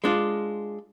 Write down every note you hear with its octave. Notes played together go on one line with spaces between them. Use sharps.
G#3 D4 F4